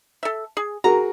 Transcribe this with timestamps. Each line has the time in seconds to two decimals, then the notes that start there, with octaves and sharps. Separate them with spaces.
0.23 A4 E5
0.57 G#4
0.84 F#4 G#4 A#4 A#5